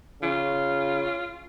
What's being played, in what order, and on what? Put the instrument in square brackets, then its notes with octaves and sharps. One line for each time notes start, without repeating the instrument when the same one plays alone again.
[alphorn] C#3 [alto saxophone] F4